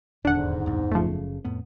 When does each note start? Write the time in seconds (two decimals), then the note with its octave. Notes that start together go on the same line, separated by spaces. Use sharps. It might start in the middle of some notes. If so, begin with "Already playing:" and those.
0.25 D#1 E2 G#2 D3 D4 F#5
0.66 F#1 C2
0.92 F#1 F#2 C#3 F3 A3
1.45 F2 A2 B3